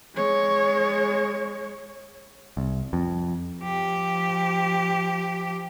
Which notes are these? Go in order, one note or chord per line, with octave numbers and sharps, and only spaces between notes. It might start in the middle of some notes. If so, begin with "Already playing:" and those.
G#3 C#5
C2
F2
F3 G4